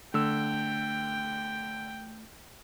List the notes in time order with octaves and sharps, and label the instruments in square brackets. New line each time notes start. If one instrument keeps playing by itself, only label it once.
[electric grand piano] D3 E6 [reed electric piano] A3 [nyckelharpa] G5